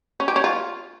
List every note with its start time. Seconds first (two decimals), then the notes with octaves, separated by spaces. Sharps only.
0.20 C#4
0.28 G4
0.36 C#4
0.44 F4